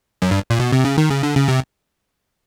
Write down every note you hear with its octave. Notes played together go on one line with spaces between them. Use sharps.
F#2
G2
A#2
B2
C3
C#3
D#3
C#3
D3
C#3
C3